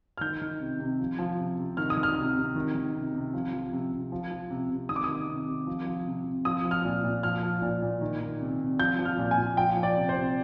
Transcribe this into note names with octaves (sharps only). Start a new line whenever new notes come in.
F6
D#3 G6
D#3
C3
C3
F3
F3
C3
C3
D#3 F6
D#6
D#3
F6
C3
C3
D#3
D#3
C3
C3
F3
F3
C3
C3
F3
F3
C3
C3
D#3 D#6
D6
D#3 D#6
C3
C3
F3
F3
C3
C3
F3 D#6
F3
F6
A#2
A#2
F3 F6
F3
A#2
A#2
D#3
D#3
C3
C3
F3 G6
F3
F6
A#2
G#5
A#2
F3 G5
F3
D5
C3
C5
C3